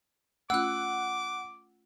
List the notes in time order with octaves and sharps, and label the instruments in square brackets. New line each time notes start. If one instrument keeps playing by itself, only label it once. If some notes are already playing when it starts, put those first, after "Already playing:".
[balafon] A3 C#4 F4 [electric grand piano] F#5 [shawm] D6 [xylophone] E6 F#6